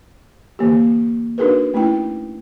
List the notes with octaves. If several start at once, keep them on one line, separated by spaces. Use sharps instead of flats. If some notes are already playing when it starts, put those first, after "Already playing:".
D3 E3 A#3 G4
D4 D#4 F#4 G#4 A#4 B4
A3 C#4 D#4 E4 G5